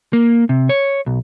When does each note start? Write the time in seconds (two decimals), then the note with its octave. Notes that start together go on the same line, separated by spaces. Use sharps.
0.13 A#3
0.49 C3
0.69 C#5
1.07 B1